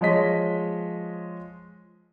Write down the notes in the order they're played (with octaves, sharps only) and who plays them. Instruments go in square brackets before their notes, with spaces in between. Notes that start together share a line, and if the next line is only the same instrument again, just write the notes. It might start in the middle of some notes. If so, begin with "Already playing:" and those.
[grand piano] F3 G#3 C#5 D#5 B6